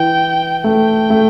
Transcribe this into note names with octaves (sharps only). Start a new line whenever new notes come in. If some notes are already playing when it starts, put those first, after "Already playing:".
Already playing: E3 G5
A3 G5
A3